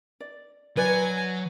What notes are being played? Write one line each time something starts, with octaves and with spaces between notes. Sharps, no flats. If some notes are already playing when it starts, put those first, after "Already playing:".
D5
F#3 B4 D5 G#5